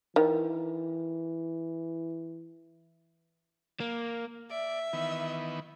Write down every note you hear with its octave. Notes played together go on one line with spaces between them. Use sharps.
D#3 E3
A#3
D5 E5
D#3 E3 B3